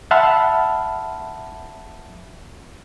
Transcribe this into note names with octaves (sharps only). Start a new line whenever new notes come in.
E5 F#5 A5 B5 C6 F6